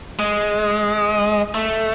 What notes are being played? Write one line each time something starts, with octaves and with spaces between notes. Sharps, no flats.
G#3
A3